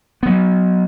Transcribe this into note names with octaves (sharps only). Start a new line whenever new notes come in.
F#3 B3